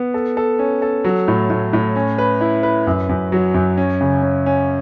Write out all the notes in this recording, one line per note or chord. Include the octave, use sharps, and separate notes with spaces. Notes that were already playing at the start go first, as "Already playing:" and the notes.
Already playing: B3
A4
A4
C#4
A4
F#3
A2
A2
A2
C#4
B4
E4
B4
F#2
F#2
F#3
F#2
C#4
C#3
C#4
C#4